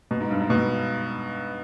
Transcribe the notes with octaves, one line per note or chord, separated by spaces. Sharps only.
B2
G#2
G2
G#2
B2